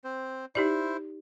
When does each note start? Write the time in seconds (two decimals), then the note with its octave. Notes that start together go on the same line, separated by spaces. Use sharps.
0.04 C4 C5
0.55 D#4 E4 G4 C5 D5